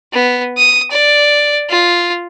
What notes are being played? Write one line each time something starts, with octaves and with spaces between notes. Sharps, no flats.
B3
D#6
D5
F4